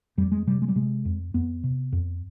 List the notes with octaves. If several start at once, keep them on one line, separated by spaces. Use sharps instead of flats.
F2 G3
G#3
C3 G3
G#3
G3
C3 G#3
F2
F2 B3
C3
F2